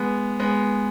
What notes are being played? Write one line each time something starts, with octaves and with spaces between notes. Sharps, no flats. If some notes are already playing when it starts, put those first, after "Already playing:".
Already playing: G#3 B3
G#3 B3